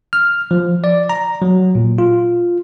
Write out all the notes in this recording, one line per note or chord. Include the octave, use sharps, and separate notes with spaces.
F6
F3
D5
A#5
F#3
A#2
F4